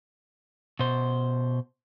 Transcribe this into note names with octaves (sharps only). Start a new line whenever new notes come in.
B2 C5